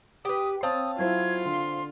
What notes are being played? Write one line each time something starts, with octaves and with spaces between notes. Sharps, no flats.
G4 B4 D#6
C4 C#5 F5 A5 D#6
F#3 E4 F4 C5 G#6
D3 C6